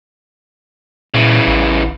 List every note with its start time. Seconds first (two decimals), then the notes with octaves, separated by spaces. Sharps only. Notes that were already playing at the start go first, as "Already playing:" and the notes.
1.14 A#2 C#3 E3
1.47 A1